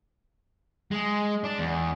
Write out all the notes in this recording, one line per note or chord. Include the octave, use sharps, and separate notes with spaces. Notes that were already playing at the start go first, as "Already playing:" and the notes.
G#3
D4
E2